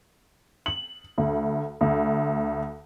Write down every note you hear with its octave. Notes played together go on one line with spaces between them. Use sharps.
F#7
D2
D2